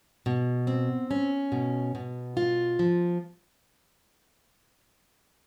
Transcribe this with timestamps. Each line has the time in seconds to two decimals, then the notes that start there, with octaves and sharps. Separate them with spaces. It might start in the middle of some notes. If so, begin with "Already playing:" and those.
0.26 B2
0.67 C4
1.11 C#4
1.52 B2
1.95 B2
2.37 F4
2.79 F3